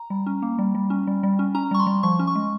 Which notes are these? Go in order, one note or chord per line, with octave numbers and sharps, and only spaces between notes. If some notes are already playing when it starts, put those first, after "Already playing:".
Already playing: A#5
G3
C#4
A#3
G3
G3
C#4
G3
G3
C#4
C#4 A#5
G3 C#6
C6
G3
F3 C#6
C#4
C#6
G#3